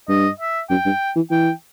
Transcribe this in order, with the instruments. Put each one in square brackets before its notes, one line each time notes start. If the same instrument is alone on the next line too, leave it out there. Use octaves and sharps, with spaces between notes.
[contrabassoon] G2 [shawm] D#5
[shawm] E5
[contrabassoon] F#2 [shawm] G5
[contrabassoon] G2
E3
[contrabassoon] E3 [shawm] G5